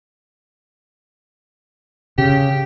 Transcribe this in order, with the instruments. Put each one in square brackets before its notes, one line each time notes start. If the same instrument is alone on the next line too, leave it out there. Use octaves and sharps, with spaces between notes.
[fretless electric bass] C#3 [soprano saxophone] G4